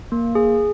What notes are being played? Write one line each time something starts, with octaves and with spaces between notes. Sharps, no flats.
A#3
G#4